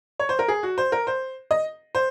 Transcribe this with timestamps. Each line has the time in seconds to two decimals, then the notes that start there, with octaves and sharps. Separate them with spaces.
0.19 C#5
0.29 C5
0.39 A#4
0.48 G#4
0.63 F#4
0.78 C5
0.92 A#4
1.07 C5
1.51 D#5
1.95 C5